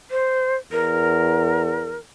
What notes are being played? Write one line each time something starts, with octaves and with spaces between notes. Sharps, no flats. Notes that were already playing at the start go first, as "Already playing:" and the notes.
C5
E2 A#4